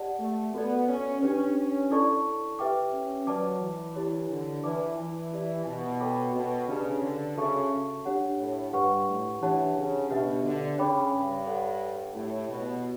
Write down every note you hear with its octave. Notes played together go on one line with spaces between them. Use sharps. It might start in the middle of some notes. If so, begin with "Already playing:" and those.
Already playing: G4 D5 F#5 A5
A3
B3 F#4 A4 D5
C#4
C#4 D4 G4 B4
C#4
E4 A4 D5 A5 C#6
G4 B4 E5 G5 D6
C#4
F#3 B4 D5 A5 D6
E3
E4 G4 C#5
D3
E3 B4 D5 A5 D6
E3
E4 G4 D5
B2
A4 C#5 G5 B5 D6
B2
C#3 D4 G4 B4 D5 A5
D3
C#3 F#4 A4 E5 A5 C#6
D4 G4 C#5 F#5
A2
G2 G4 B4 F#5 C#6
A2
E3 D4 G4 C#5 F#5 A5
C#3
B2 D4 G4 B4 E5
D3
C#3 C#5 G5 B5 D6
G2
A4 C#5 F#5
A2 E4 G4 C#5
B2